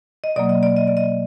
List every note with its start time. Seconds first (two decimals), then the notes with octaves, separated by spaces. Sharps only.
0.24 D#5
0.36 B2 F#3 A#3 D5
0.49 D#5
0.63 D5
0.77 D#5
0.87 D5
0.97 D#5